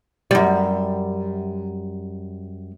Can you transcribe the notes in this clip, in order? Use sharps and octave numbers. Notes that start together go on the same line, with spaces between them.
F#2 G3